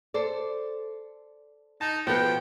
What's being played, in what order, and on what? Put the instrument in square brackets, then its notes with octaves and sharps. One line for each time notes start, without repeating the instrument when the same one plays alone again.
[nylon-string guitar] A4 C5 D5
[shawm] D#4 [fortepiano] A5
[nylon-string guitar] B2 [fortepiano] F3 B3 [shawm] G5